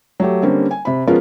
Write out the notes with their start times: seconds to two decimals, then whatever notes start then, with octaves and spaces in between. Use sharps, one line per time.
0.20 F#3 A3 G4
0.43 D3 G3 A#3 C4 C#4
0.71 G#5
0.85 C3 B5
1.07 F3 G#3 B3 C#4 F4 A#4